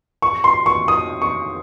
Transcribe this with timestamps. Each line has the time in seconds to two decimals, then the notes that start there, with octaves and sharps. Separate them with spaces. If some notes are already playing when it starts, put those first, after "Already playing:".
0.22 C#6
0.44 C6
0.66 C#6
0.88 D#6
1.22 C#6